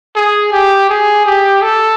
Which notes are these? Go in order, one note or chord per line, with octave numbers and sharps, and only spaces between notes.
G#4
G4
G#4
G4
A4